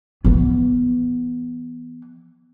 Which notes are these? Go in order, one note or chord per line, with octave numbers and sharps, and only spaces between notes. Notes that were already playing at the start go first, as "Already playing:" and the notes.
E3 B3